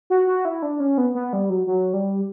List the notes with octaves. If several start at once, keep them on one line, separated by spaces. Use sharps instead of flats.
F#4
F#4
E4
D4
C#4
B3
B3
G3
F#3
F#3
G3